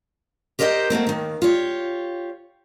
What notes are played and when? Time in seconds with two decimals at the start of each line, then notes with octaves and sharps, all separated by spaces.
0.59 G4 A#4 C5 D#5 E5 G5
0.90 F#3 A3 A#3 C4
1.07 D#2 D#3
1.42 F4 G4 C#5